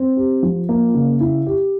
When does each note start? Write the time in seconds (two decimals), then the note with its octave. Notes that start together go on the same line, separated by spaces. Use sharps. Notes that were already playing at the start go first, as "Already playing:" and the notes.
Already playing: C4
0.17 G4
0.43 F3
0.69 A#3
0.94 C#3
1.20 E4
1.47 G4